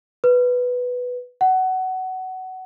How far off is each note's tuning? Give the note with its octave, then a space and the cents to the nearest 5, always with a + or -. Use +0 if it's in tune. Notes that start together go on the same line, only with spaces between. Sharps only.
B4 +0
F#5 +20